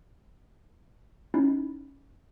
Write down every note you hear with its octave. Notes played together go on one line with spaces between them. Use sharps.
C#4 D#4 E4